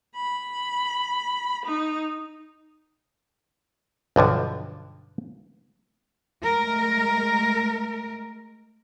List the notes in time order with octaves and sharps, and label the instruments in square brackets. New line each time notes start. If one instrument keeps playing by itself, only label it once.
[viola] B5
D#4
[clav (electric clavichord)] B1 G2 D3 F3
[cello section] G#3 A3 A#4